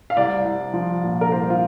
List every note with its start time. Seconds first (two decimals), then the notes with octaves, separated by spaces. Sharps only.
0.10 F5
0.17 C2 D5
0.45 C2
0.73 F3
1.03 A#2
1.21 A#4
1.32 C2 C5
1.50 F4